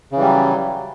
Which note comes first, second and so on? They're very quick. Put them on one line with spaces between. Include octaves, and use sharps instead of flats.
C#3 E3 G3 F#3